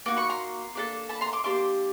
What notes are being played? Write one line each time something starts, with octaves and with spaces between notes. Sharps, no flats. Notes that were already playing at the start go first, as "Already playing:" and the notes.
A#3 D#4 F#4 D6
B5 C#6
A#5 C6
A#3 D4 F#4 A4
A5 B5
A#5 C6
C6 D6
A#3 D4 G4 C6 D6